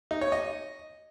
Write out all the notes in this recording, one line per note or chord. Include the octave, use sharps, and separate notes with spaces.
D#4
C#5
D#5